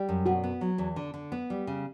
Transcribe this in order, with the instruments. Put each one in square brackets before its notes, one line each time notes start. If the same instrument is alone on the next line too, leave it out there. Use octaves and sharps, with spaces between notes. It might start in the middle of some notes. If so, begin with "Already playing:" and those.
Already playing: [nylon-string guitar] G3
F#2
[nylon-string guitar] B2 [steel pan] F#4
[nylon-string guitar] B3
F#3
E2
D3
D3
B3
G3
C#3